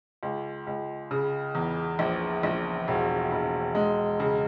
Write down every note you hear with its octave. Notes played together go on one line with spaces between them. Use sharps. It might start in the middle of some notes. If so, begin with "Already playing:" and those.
C#2
C#2
C#3
E2
A#1
A#1
E1
E1
G#3
C#3